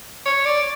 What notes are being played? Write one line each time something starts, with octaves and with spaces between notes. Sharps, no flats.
C#5
D5